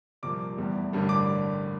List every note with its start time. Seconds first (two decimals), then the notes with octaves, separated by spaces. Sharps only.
0.23 C2 A#2 F3 A#3 D6
0.57 F1 E2 E3 G3
0.92 A1 G2 D3 G3 A#3
1.09 D6